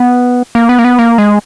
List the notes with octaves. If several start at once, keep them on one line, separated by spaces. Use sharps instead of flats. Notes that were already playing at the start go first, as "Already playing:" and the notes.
Already playing: B3
A#3
B3
A#3
B3
A#3
G#3